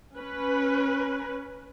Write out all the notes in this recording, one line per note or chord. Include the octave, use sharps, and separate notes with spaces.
C#4 B4